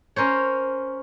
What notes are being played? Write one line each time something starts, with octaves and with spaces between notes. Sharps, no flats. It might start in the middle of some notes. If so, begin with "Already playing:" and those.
C#4 A#4 C5 C#5